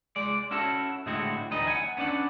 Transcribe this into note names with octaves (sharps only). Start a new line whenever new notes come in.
G#3 D5
C#4 E4 F#4 A4
A2 D3 G#3 C4 E4 F#4
D2 E3 G3 D#4 B4 D#5
F#5 G#5
B3 C#4 D4 F#5